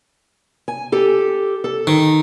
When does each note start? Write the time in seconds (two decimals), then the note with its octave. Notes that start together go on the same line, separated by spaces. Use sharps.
0.68 G#5
0.92 G4 A4
1.64 A4
1.87 D#3